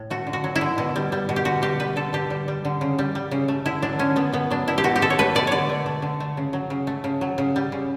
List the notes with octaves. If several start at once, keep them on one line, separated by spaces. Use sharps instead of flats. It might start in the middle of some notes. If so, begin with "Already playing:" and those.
Already playing: A2
A3 F#4
D3
F#4
F#3
E4
D3
B2
G3
G3
B2
G4
D3 F#4
G3 G4
G3 B4
D3 A4
D3 G4
G3
G3
D3
C#3
G3
G3
C#3
A3
D3 E4
F#3 D4
D3 C#4
A3 B3
B2 B3
F#3 D4
B2 E4
G4
B2 F#4
G4
A3 A4
C#5
A3 B4
B2 D5
D3 C#5 D5
A3
A3
D3
A3
C#3
F#3
C#3
A3
C#3
F#3
C#3
G3
C#3